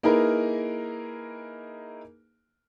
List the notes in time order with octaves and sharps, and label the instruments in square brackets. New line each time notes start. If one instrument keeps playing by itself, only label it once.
[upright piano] A#3 D#4 E4 G#4 A#4 B4